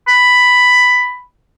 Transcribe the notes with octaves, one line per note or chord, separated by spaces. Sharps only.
B5